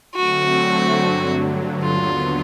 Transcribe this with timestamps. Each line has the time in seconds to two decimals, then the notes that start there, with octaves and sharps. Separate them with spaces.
0.15 D3 F#3 A3 C4 F#4
0.99 G2 D3 F#3
1.81 D#2 D3 F#3 B3 F4